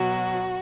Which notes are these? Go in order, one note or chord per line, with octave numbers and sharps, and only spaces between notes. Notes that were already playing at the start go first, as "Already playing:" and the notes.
Already playing: B2 F#3 F#4